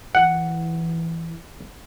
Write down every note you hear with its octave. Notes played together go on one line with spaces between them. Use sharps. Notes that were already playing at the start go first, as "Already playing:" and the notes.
E3 F#5